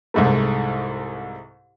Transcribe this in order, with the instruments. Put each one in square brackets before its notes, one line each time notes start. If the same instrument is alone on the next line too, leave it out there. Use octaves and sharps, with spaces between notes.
[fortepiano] C2 G#2 A3